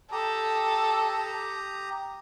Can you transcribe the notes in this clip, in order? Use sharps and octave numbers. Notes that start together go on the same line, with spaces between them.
G4 A4 A#5 D#6